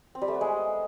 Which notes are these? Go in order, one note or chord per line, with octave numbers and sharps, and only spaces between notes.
C4
G3
A3
B3
G#3